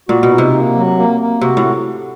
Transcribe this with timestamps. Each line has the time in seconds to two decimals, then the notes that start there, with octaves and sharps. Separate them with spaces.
0.09 A#2 F#4
0.23 B2
0.30 D#4
0.38 C3
0.53 A#3
0.75 F#3
0.98 A#3
1.20 A#3
1.41 C3 F#4
1.57 A2